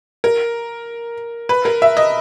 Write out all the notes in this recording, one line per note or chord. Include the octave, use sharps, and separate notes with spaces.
A#4
B4
A#4
E5
D#5